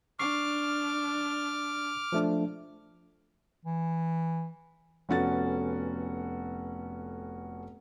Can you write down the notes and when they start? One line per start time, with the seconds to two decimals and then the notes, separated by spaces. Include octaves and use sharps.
0.19 D4 C#6 D6 F6 C7
2.12 F3 A3 D4
3.65 E3
5.09 F1 B3 C#4 F#4 A4 A6